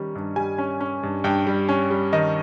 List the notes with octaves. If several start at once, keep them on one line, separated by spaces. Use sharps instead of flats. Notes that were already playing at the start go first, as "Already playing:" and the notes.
Already playing: D#3 G3 C#4
G2
G3 G#5
C#4
C#4
G2
G2 G5
G3
C#4
G3
D#3 D#5